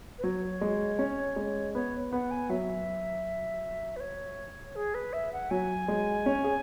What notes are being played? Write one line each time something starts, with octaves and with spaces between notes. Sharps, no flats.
B4
F#3 C#5
G#3
C#4
G#3
B3 C#5
B3 F#5
G#5
F#3 E5
B4
C#5
G#4
B4
E5
F#5
F#3 G#5
G#3
C#4
G#4